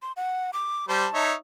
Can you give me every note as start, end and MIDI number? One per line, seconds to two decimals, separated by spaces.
0.02 0.12 84
0.17 0.51 78
0.53 0.88 86
0.89 1.06 55
0.89 1.06 72
0.89 1.25 81
1.14 1.33 63
1.14 1.33 73
1.14 1.33 76